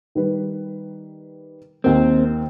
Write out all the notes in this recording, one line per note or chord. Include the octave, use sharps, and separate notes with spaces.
D#3 G3 B4
D#2 A#3 C4